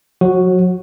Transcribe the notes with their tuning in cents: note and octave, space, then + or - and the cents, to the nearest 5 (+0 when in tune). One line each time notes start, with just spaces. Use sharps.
F#3 -35 F#4 +0